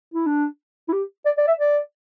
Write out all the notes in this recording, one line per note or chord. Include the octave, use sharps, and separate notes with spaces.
E4
D4
E4
G4
D5
D5
E5
D5